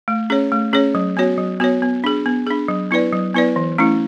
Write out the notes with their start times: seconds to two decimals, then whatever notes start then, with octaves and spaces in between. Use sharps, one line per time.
0.08 A3
0.30 C#4 G#4 C#5
0.52 A3
0.73 C#4 G#4 C#5
0.95 F#3
1.17 B3 F#4 C#5
1.38 F#3
1.60 B3 F#4 C#5
1.82 B3
2.04 D4 G#4
2.26 B3
2.47 D4 G#4
2.68 F#3
2.91 B3 E4 B4 D5
3.12 F#3
3.34 B3 E4 B4 D5
3.56 E3
3.78 A3 C#4 E4